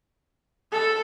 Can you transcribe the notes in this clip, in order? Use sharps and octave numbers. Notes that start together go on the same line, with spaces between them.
A4